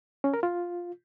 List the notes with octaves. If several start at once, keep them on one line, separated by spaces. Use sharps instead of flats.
C#4
A#4
F4